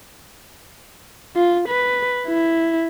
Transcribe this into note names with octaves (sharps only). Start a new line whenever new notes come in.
F4
B4
E4